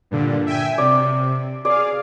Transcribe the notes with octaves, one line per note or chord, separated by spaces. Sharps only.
G2 A#2 D3
E5 G5 G#5
C3 D5
G#4 D5 F5